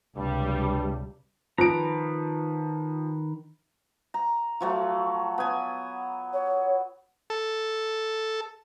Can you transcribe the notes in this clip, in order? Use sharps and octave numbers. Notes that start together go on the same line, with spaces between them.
C#2 G2 C3 G3
D#3 F3 B4 A#5 D7
A#5
F3 F#3 A3
B3 G#5
C#5
A4